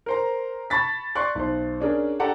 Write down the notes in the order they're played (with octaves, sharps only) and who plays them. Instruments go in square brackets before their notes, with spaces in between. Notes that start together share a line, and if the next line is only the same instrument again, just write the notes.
[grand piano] A#4 C5 A#5
A5 B5 C#6 A6 B6
D5 C6 C#6 F#6
B1 C5
C#4 D4 G#4 A#4
D4 G4 A4 F#5 A5 A#5